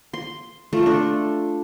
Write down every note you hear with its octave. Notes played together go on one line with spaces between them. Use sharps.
C6
A3 F4
D4 A4